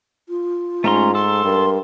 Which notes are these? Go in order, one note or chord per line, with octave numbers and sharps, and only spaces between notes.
F4
G#2 A3 C#4 A#5 C6
A4 C6
G2 A#4